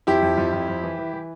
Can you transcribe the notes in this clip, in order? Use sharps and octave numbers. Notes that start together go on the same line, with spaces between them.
F2 E4 G4
F2
F2
F2
F2
E3
E3
E3